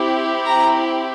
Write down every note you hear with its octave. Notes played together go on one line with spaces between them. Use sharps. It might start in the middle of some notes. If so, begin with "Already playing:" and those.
Already playing: C4 E4 G4
A#5